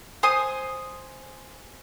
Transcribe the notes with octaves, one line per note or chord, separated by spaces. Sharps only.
C5 G#5 D#6